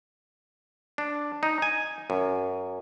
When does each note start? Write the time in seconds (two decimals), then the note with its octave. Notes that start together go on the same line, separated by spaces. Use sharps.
0.98 D4
1.43 D#4
1.62 G#5
2.10 F#2